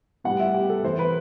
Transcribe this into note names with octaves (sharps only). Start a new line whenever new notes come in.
A2 G3 B3 F#5
E5
G4
A4
F#2 E3 B3 C5
B4